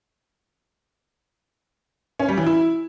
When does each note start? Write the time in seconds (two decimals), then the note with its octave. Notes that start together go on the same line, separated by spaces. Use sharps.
2.19 C#4
2.28 G3
2.37 E3
2.46 E4